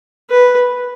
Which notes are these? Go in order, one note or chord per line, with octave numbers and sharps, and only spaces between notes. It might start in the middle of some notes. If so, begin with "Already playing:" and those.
B4